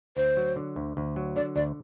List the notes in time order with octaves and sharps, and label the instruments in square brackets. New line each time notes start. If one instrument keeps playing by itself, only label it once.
[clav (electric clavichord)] D2 [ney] C5
[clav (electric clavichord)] F#3
D3
D2
D2
F#3
[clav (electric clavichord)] D3 [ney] D5
[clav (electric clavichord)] D2 [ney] D5